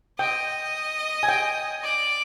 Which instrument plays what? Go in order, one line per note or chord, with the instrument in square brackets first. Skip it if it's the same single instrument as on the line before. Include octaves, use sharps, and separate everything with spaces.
[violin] D#5 [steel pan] G5
[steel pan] G#5
G5
[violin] D5